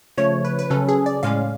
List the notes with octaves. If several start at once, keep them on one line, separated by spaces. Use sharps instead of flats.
C#3 F3 A3 C#5
B4
B4
C#3 F#3 C#4 A4
G#4
D5
A2 G#3 C#4 F5